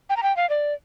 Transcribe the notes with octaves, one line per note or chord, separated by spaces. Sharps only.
G5
A#5
G5
F5
D5